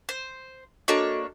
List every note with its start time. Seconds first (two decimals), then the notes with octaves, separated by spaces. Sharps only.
0.09 C5
0.88 A#3 D4 F#4 A4 C#5 D#5